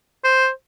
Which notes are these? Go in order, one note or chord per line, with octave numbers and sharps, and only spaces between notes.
C5